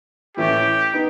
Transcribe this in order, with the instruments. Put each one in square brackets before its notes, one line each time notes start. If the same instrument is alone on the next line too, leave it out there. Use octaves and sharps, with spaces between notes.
[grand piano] A2 E3 A3 C#4 [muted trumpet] G4
[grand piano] B3 D#4